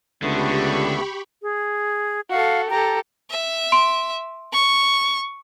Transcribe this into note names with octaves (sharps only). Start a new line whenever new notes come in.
C#2 D3 A3 B3 G4 B5 C#6
G#4
F#4 A4 F5
G4 A4 A#5
E5
C6 D7
C#6